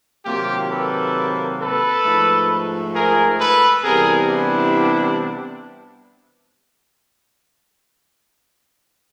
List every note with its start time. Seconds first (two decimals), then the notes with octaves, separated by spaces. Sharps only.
0.25 C3 D#3 F#3 A#3 F4 G4
0.70 A4 B4
1.60 A4 B4
2.04 G#2 F3 A3
2.94 G#4 A#4
3.39 A4 B4
3.83 C3 E3 G3 B3 G#4 A#4
4.29 D4 E4